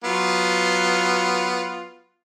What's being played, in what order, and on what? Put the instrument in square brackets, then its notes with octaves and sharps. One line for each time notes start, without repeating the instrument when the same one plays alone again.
[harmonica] F#3 B3 F4